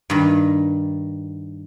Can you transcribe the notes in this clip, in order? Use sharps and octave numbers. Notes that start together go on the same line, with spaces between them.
G2 D#3